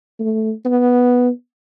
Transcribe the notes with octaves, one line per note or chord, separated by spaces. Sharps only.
A3
B3